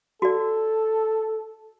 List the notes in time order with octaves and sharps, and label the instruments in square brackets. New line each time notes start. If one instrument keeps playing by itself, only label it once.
[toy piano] F#4 D5 [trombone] A4